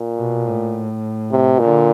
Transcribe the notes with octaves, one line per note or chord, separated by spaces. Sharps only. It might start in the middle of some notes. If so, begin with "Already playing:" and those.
Already playing: A#2
B2
A2
C3
A#2 D3